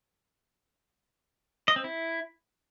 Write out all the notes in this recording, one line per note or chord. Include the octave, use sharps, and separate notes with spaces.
D#5
C4
E4